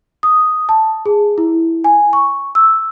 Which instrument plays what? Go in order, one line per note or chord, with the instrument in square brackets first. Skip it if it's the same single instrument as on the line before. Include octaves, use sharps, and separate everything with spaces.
[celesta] D#6
A5
G#4
E4
G#5
C#6
E6